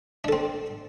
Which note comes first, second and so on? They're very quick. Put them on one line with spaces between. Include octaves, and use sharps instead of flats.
D4 A4 C4